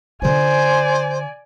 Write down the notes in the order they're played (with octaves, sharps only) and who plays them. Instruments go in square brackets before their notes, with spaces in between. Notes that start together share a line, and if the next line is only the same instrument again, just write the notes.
[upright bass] D3 F4 [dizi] C5 [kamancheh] D5 G#5